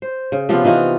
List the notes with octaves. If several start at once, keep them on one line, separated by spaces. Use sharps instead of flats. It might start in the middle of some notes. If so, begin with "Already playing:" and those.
C5
C#3
C3 F3 B3 F4
E3 D#4 F4 F#4